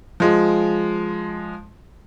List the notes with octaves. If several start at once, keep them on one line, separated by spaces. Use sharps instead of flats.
F3 G#3